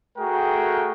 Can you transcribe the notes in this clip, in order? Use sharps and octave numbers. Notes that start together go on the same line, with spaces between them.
A3 F#4 G#4 A#4 G5